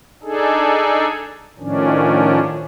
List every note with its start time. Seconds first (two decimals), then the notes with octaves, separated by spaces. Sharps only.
0.23 D4 D#4 G#4 A4
1.59 A2 D#3 F3 C#4 D4